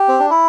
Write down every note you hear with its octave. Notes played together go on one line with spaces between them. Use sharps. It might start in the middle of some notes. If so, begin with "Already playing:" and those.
Already playing: G4
C4
D4
E4